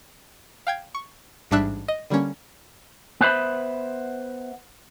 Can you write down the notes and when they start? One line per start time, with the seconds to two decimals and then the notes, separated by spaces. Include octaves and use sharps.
0.67 F5 G5 G#6
0.95 C#6
1.51 A1 G#2 G3 D4 E5 F#6
1.88 D#5
2.10 D3 G3 A#3 C#4
3.21 B3 B4 C5 E5 B5